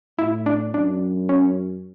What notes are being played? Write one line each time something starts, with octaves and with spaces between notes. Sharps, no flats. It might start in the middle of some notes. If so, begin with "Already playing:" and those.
A2 E4
D4
F#2 D4
C#4